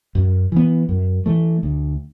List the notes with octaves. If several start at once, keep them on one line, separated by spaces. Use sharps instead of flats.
F#2
E3 B3
F#2
E3 A3
D2